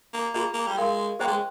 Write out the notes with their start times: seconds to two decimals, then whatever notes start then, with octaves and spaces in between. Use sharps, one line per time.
0.14 A#3
0.34 A#3 F4 G#4 D#5
0.54 A#3
0.67 G3
0.77 G#3 A#4 F5 C6
1.19 A#3 G#4 C5 D#5 G5 C6
1.28 G#3